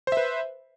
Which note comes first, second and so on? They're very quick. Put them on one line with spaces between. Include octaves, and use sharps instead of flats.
C5 E5 B4